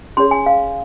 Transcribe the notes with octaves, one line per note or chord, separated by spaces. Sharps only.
C#4 G#4 C#5 C6
G#5
F5